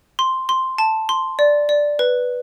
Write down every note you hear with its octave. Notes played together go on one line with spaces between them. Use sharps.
C6
C6
A5
C6
D5
D5
B4